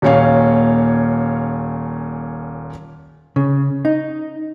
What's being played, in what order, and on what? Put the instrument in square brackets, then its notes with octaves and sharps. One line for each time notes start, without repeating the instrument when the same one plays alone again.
[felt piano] D#1 A#2 C#4 C#5 F5
[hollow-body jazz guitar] C#3
D#4